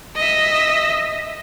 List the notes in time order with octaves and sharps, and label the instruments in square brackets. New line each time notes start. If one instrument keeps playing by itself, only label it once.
[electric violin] D#5 E5